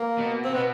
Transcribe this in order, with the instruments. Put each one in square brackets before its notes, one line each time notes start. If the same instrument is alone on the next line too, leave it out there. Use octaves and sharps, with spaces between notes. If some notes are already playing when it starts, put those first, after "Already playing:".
Already playing: [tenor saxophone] A#3
[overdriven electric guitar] B2
[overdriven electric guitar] C3 [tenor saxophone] C4
[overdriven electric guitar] B2 [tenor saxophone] B3